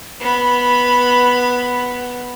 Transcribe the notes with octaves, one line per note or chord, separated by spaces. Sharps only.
B3 B5